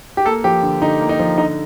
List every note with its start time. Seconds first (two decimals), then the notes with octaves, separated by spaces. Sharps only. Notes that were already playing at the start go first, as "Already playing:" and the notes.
0.17 G4
0.25 A#3 A4
0.44 F3 G4
0.63 D3
0.82 D3 D#4
1.01 A#3
1.09 D#4
1.19 F3
1.38 D3 D#4